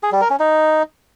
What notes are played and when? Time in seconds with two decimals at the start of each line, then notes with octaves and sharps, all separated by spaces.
0.03 G#4
0.12 G3
0.21 A#4
0.30 C#4
0.39 D#4